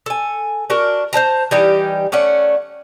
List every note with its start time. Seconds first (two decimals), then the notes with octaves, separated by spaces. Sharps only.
0.06 A4 G#5
0.70 D4 F#4 A#4
1.13 C5 C#5 A5 A#5
1.51 E3 G3 D#4 G4
2.12 A3 C#4 D5 F#5